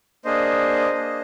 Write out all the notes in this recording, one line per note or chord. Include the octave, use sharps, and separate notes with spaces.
A#3 D4 G#4 C5 D#5
A#3 D4 G#4